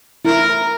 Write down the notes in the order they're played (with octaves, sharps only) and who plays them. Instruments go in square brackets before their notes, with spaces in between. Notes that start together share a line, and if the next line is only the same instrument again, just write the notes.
[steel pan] E4 [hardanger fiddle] A#4